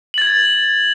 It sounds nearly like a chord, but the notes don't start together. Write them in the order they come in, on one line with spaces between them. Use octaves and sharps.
F#7 A6 G#6